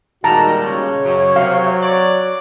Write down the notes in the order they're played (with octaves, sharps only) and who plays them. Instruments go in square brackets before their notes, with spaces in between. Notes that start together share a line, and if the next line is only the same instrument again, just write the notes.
[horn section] A#2 G3 G#3 [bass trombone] D#3 [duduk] F#4 [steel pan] A5 A#5
[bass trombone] C#3 [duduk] C#5
[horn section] F#2
[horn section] C3 [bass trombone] F#3 [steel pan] F5
[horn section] D5